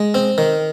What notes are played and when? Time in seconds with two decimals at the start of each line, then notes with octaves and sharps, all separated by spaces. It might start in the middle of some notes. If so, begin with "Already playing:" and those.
Already playing: G#3
0.14 C4
0.38 D#3